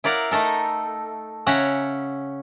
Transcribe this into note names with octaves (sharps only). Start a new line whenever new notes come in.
E4 A#4 D5 F5 F#5
A3 D#4 A4 A#4
C#3 C#4 E5 F#5 A#5